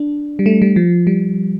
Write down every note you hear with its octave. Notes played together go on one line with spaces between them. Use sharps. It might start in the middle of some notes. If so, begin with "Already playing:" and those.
Already playing: D4
G3
A3
G3
F3
G3